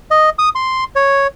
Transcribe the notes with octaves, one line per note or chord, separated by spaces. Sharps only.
D#5
D#6
C6
C#5